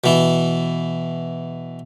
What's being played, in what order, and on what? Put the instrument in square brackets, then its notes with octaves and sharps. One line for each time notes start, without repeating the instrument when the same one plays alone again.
[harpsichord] B2 E3